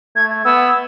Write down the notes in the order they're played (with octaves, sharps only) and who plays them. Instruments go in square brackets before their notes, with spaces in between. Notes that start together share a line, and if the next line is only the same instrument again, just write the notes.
[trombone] A3 [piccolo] G#6
[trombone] B3 [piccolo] E6